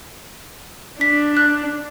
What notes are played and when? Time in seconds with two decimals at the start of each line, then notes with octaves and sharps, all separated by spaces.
1.01 D4 B6
1.37 F#6